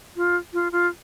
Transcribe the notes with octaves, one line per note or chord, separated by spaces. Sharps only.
F4
F4
F4